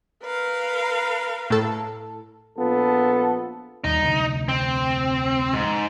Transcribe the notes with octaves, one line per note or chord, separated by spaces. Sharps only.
A#4 B4 F5
A2 A4
A#1 B3 F4 A4
D#2 G3 D#4
F1 D2 D3
C4
G#2